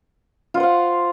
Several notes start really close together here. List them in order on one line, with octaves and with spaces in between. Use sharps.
F4 F#5 C5 F5